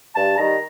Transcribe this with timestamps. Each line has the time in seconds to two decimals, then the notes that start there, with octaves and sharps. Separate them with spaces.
0.14 G2 A5
0.36 D#3 G3 A#5